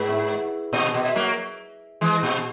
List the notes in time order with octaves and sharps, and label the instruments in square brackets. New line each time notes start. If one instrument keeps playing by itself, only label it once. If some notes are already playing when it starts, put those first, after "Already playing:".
Already playing: [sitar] G#2 [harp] G#4 B4
[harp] E4
[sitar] A#2 [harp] D#5
[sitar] B2
[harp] E5
[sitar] F#3 A#3
E3 G#3
A#2